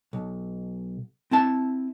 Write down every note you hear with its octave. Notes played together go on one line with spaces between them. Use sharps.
B1
C4 E4 A5